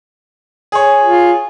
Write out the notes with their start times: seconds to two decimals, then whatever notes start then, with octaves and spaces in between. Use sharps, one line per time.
0.72 G#4 C#5
1.04 F4